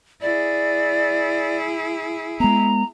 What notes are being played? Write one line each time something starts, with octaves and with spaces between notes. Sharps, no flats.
E4 G#4 D5
G#3 B3 A#5